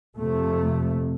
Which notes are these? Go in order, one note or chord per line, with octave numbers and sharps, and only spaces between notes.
F2 C3 A3